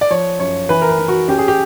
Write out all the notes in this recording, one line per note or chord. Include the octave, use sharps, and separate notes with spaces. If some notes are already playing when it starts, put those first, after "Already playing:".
D5
F3 C#5
F#2 C#5
E3 B4
A#4
B4
E3
F#4
C#4 G4
G#4
G4